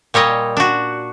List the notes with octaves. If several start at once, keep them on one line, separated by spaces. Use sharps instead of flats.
A#2 G3 C#5 D#5
D4 F#4